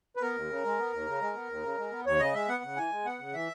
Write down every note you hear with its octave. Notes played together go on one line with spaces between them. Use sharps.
B4
B3 A#4
D#2
C#3
G#3
B3
D#2
C#3
G#3
B3
D#2
C#3
G#3
B3
D#2 C#5
C#3 D#5
G#3 E5
B3 F#5
C#3
E3 G#5
G#3
B3 F#5
C#3
E3 E5